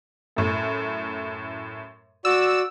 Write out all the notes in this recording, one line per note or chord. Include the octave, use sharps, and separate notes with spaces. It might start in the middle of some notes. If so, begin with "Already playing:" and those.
F#2 A2
F#4 D5 E6